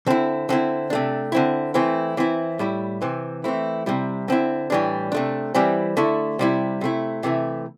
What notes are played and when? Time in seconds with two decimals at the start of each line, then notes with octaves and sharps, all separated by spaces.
0.07 D3 C4 E4
0.49 D3 C4 E4
0.90 C3 A3 D4
1.32 D3 C4 E4
1.74 E3 A3 C4 E4
2.17 E3 C4 E4
2.59 A2 G3 E4
3.02 C3 E3 C4
3.44 E3 A3 C4 E4
3.86 C3 G3 E4
4.28 D3 C4 E4
4.70 A2 E3 G3 D4
5.12 C3 A3 D4
5.54 E3 G3 C4 E4
5.97 D3 A3 E4
6.39 C3 G3 E4
6.81 C3 A3 E4
7.23 C3 E3 A3 E4